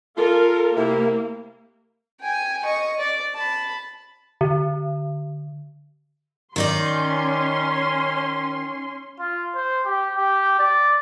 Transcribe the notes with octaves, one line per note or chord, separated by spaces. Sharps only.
F4 A4 A#4
C3 A#3 E4
G5 G#5
D#5 C#6
D5
A5 B5
D3
D#3 C#4 D#4 D5 C6
F4
C5
G4
G4
D5